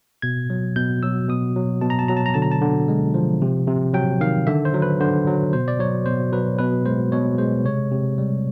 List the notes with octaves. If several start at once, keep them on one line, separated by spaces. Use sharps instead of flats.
B2 G#6
F#3
B2 G6
F#3 E6
B2 D#6
F#3
B2 A5
A#5
A5
F#3 A#5
A5
A#5
D3 A5
A#5
A5
D3
G#3
F3
C3
C3
F#3 G5
D#3 F5
D3 E5
C5
F#3
B4
D3 C5
F#3
B2 C5
D5
F#3 C#5
B2 C5
F#3 B4
B2 B4
G#3 C5
B2 C#5
G#3 C5
C3 C#5
C3
G3